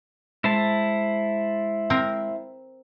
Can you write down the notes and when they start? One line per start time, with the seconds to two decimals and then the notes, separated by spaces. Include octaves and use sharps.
0.44 G#3 E4 C5 A5
1.90 C4 A#4